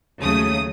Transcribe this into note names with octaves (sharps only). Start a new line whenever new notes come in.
D#2 C#3 F#3 A3 D#6